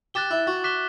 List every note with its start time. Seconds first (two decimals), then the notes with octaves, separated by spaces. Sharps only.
0.14 G4 F#6 A6 E7 G7
0.31 E4
0.47 F#4
0.64 D6 F#6 B6 E7 G7